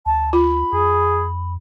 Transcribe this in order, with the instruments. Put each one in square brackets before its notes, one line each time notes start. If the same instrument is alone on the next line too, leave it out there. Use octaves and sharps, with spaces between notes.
[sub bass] D2 [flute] A5
[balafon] F4 [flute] B5
[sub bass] F2 [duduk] G#4